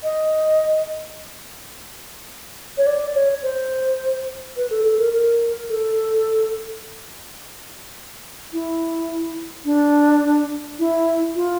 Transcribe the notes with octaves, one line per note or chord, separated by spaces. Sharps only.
D#5
C#5
D5
C#5
C5
B4
A4
A4
A#4
A#4
A4
E4
D4
E4
F4